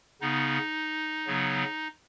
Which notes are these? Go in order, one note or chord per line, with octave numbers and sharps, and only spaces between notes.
C#3 B3 D#4
C#3 F#3 B3